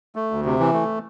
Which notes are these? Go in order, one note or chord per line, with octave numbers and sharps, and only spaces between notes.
A3
D2
C3
E3
A3